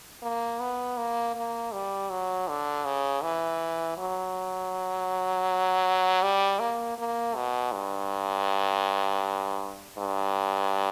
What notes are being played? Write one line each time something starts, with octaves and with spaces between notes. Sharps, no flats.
A#3
B3
A#3
A#3
G3
F#3
D3
C#3
E3
F#3
G3
A#3
A#3
B2
G2
G2